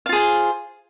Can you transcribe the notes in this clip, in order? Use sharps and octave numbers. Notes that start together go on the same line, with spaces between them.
F4 G#4 C5 F5